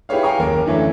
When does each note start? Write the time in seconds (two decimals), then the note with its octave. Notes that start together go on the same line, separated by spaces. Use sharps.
0.09 E4 G4 G#4 B4 C#5 F5
0.23 F5 G5 G#5 A#5 C#6
0.39 F#1 D#2 A#4 D6
0.65 F#2 D3 E3 A3 C#5